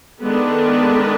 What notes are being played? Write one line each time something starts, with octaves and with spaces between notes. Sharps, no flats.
D#3 G#3 B3 D4 A4 B4